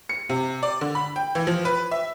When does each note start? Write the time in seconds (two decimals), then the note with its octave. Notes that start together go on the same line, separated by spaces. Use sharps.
0.09 C#7
0.29 C3
0.63 D5
0.81 D3
0.95 B5
1.16 G5
1.35 E3
1.47 F3
1.65 B4
1.91 E5